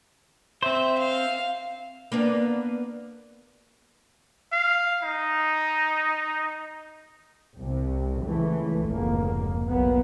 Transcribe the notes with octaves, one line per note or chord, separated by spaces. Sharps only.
C4 C5 E5
F5
A#3 B3 D4
F5
D#4
C2 C3
C#2 E3 A3
F1 C#2 G#2 A#3
B1 A#3 B3